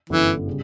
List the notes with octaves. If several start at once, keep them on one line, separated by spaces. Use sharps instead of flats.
G1 F#2 D3 E3 A3 E4
C#3 G3